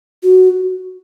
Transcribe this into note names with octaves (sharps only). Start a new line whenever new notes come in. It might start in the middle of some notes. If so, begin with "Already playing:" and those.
F#4